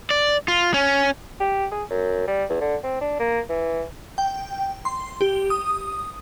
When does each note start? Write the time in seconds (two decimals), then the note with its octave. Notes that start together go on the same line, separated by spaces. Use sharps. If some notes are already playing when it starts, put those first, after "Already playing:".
0.10 D5
0.48 F4
0.74 C#4
1.40 G4
1.72 G#4
1.90 F#2
2.28 G3
2.49 E2
2.61 D3
2.83 C4
3.01 D4
3.19 A#3
3.49 E3
4.18 G5
4.85 C6
5.21 G4
5.50 D#6